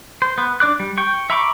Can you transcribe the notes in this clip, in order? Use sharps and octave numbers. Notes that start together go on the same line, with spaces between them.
C5
B3
D4 D5 D6 F#6
G3
G5 C#6
E5 A#5 B5 C#6 D6